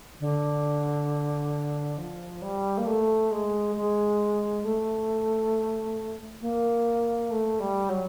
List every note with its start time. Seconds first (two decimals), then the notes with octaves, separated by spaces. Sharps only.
0.20 D3
1.98 F3
2.42 G3
2.78 A#3
2.86 A3
3.31 G#3
3.75 G#3
4.64 A3
6.41 A#3
7.30 A3
7.60 G3
7.89 F#3